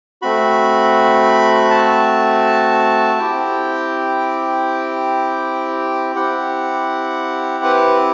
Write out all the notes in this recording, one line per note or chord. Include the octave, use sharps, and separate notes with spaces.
A3 C4 F#4 B5
A5
C4 E4 G4 G5
C4 E4 G4 F#5
B4